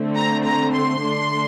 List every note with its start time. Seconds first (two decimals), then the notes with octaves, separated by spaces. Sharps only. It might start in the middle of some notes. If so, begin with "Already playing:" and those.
Already playing: D3 A3 C4
0.15 A#5
0.44 A#5
0.74 C6
1.03 D3 A3 D4